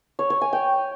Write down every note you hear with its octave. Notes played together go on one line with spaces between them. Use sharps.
C#5
C#5
G#5
G5